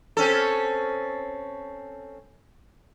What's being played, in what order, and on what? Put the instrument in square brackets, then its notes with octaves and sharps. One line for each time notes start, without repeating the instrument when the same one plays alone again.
[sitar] C4 C#4 A4